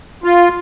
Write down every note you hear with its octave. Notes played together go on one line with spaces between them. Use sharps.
F4